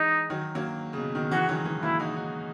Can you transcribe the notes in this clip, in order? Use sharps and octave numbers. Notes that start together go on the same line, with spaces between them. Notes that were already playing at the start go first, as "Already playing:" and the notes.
Already playing: E3 G#3 D#4
D#3 F#3
F#3 A#3
C#3
B2
B2 D#3
C#3 E3 F#4
D#3 F#3
E3 G#3
F#3 A#3 E4
D#4 F#4
D#4 F#4